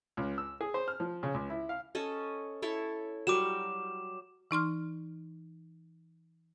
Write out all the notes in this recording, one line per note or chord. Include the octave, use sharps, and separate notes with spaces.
C#2
E6
G#4
C5
F6
F3
C#3
C#2
E4
F5
C#4 A4 D#5
E4 A4 C#5
F#3 G3 A#4 D6 E7
E3 D#4 C6 F6